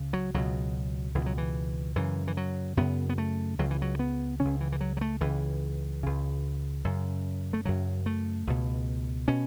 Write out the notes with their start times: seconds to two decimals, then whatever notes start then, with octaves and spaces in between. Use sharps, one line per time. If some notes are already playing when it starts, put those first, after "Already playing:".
Already playing: C#2 C#3
0.13 F#3
0.34 C#2 B2 F#3
1.15 C#2 B2 E3
1.26 F#3
1.38 E3
1.96 F#2 C#3 E3
2.27 E3
2.37 F#3
2.77 F#2 C#3 B3
3.09 B3
3.18 A3
3.59 C#2 C#3 F#3
3.71 E3
3.82 F#3
3.99 B3
4.40 C#2 C#3 C#4
4.61 E3
4.72 E3
4.81 F#3
4.97 F#3
5.01 A3
5.21 C#2 C#3 E3
6.03 C#2 C#3
6.85 F#2 C#3
7.53 A3
7.65 F#2 C#3 F#3
8.06 A3
8.47 C#2 B2
9.28 B2 C#4